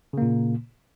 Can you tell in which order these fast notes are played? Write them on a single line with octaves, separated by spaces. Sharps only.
C#3 A#3 A#2